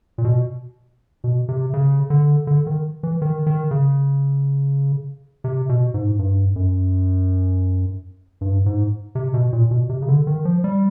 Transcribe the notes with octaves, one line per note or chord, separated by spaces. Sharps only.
A#2
B2
B2
C3
C#3
D3
D3
D#3
E3
D#3
D#3
C#3
C3
B2
G#2
G2
F#2
G2
G#2
C3
B2
A#2
B2
C3
C#3
D3
D#3
F3
G3